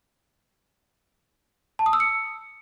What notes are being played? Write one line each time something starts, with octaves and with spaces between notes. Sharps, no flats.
A5
D#6
E6
C#7